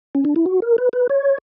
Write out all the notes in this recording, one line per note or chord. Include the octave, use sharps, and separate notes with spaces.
C#4
D4
E4
F#4
A#4
B4
B4
C#5